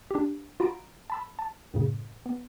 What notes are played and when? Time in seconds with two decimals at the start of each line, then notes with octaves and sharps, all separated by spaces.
0.11 D4 G4
0.60 F4 F#4 A#5 B5 D7
1.10 A5 B5 E6
1.39 A5
1.74 F#2 A2 C#3
2.26 B3